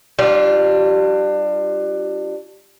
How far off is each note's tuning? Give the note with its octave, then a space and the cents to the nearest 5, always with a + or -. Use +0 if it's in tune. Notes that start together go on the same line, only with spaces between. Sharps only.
G3 -30 D4 +25 F4 +0